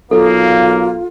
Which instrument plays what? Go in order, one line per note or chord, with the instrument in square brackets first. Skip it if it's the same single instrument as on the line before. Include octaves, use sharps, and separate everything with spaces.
[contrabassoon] B1 [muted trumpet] A#3 [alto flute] F4 [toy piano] A4